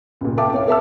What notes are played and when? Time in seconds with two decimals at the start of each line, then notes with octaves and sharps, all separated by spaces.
0.21 C#2 A#2
0.37 A4 E5 F5 G5 A5 D6
0.53 C2 C#5 F5
0.68 A4 E5 A5 E6